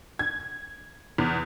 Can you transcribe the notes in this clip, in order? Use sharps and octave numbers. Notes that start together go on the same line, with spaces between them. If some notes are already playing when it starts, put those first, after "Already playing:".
G#6
E2